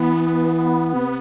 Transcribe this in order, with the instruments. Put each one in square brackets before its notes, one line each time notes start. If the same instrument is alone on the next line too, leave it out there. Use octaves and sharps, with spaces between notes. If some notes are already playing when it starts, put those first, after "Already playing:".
Already playing: [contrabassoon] E3 [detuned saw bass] B3
[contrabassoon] C3